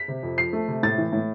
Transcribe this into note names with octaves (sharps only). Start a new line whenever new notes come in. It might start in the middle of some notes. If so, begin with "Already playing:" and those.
Already playing: B6
C3
F2
F3 C7
A3
C3
A2 A6
E3
A2